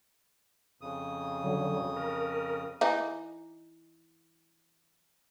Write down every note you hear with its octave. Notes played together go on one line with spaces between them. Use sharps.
F2 C#3 D#6
D3 F#3
A#4
E3 D#4